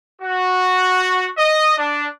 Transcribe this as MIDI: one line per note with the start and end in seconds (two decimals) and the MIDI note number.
0.21 1.27 66
1.37 1.74 75
1.77 2.05 62